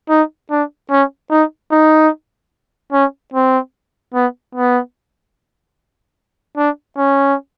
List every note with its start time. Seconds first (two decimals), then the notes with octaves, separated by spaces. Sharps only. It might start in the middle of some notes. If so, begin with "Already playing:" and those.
0.10 D#4
0.51 D4
0.91 C#4
1.31 D#4
1.72 D#4
2.93 C#4
3.34 C4
4.14 B3
4.55 B3
6.57 D4
6.98 C#4